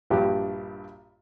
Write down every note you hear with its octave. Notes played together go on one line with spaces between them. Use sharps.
A#1 G2 F#4 G4